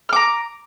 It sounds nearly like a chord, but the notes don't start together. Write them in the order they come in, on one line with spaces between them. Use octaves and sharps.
F6 D6 A#5